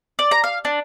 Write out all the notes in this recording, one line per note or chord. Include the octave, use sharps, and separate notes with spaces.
D5
A#5
F5
D4